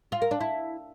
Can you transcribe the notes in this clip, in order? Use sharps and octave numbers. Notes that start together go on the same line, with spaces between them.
F4
A#4
D4
E4